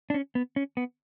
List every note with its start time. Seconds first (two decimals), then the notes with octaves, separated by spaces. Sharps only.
0.10 D4
0.14 C#4
0.35 B3
0.56 C#4
0.77 B3